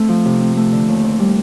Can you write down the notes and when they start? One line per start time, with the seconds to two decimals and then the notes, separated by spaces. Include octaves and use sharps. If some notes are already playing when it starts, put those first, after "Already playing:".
Already playing: A3 C4
0.09 F3
0.25 C3
0.40 C4
0.56 A3
0.72 D3
0.88 D#2
1.04 C4
1.20 G3